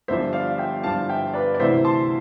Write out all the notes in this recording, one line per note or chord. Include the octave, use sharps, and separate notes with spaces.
G1 G2 F3 C5 E5
D5 F5
E5 G5
G1 G2 F3 F5 A5
E5 G5
B4 D5
D5
D2 C3 E3 C5 E5
A5 C6